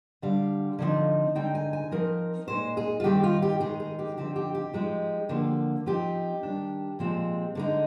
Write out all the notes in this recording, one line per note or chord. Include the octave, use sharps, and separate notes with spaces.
D3 G3 D4 F5
D3 F3 C4 D#4
D3 G#3 D#4 G5
G#5
G#5
F3 C4 D#4 A#4
A#2 G#3 D#4 C5
G#4
F4
D#3 G3 C4 D#4 G4
F4
G4
D#3 G#3 D#4 G#4
G#4
G4
D3 F3 C4 D#4 G4
G4
G4
F3 G#3 D#4
D3 F3 A#3
F3 C4 D#4 G4
D#3 G3 D4
A#2 F3 G#3 C4
D3 G#3 D#4